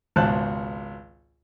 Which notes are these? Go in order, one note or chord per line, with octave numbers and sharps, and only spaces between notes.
G#1 C#2 B2 C5 A5 F#6